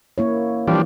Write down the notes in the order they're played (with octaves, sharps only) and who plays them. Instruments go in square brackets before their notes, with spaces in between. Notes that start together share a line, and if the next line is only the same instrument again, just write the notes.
[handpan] A#3 E4 C#5
[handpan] E3 [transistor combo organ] F3 G3 D4